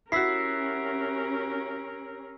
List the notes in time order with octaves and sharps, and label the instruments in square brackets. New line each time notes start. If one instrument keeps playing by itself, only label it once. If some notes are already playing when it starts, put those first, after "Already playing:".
[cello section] C#4 [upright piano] E4 F#4 [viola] G4 A#4 [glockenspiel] E6 B6 C7